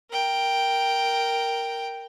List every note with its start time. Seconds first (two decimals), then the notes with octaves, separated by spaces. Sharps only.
0.11 A#4 G5